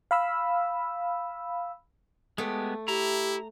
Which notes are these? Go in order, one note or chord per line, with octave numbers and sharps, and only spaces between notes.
F5 B5 E6
G#3 A3 B3 G4
E4 G4 A#5